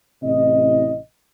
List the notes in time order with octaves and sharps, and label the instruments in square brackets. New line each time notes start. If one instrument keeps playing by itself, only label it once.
[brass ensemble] A1 A2 C3 E4 D#5